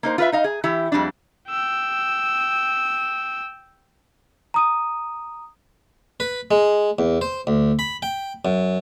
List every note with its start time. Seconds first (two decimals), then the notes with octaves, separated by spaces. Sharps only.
0.03 A#3 D#4 C5
0.18 F4 B4 E5
0.32 D#4 D#5 F5
0.44 G#4
0.64 E3 E4 G4
0.92 F2 G3 G#3 D4
1.49 G5 E6
4.54 A#5 D#6 D#7
6.20 B4
6.51 G#3
6.99 E2
7.21 C5
7.47 D2
7.79 B5
8.02 G5
8.45 F#2